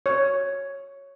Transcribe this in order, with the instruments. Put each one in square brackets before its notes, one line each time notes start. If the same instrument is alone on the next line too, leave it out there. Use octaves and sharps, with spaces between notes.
[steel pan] C#5